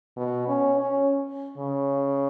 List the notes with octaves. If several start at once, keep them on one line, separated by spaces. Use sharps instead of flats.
B2
C#4
C#4
C#3